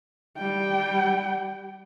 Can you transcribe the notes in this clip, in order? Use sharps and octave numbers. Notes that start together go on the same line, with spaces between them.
G3 G5